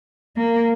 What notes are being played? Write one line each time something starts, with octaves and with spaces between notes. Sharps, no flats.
A#3